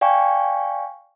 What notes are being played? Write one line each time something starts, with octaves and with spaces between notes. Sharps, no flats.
D5 F5 G5 G#5 C#6